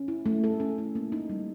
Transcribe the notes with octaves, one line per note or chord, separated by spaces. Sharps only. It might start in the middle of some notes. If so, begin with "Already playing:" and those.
Already playing: C#4
E4
A3
A4
C#4
E4
A#3
D#4
G3